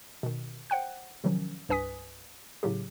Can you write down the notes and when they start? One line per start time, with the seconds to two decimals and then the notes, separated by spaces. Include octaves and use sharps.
0.23 B2 D#3
0.70 C5 F#5 G5 F#6
1.24 C3 D#3 F3 F#3 C#4
1.69 C2 G2 B4 G#5 D#6 B6
2.63 A2 C#3 F#3 G4